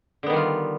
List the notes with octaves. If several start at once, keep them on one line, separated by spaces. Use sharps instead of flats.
D3 D#3 G3 B3 F4